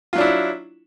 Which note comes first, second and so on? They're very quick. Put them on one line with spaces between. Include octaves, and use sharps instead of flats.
F4 F#3 D4 E4